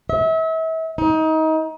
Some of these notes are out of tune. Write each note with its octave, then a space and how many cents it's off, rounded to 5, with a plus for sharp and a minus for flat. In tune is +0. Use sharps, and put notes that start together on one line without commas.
E5 -35
D#4 +25